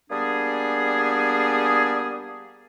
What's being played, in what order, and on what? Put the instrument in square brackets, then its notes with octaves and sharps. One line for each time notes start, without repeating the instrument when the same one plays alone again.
[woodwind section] G3 A#3 B3 D4 G#4